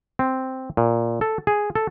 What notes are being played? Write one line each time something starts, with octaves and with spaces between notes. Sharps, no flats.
C4
A#2
A4
G#4
A4